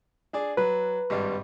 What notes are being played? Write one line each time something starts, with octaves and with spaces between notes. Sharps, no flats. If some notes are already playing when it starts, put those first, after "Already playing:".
D4 G#4 D5
F#3 B4
G#1 G2 G3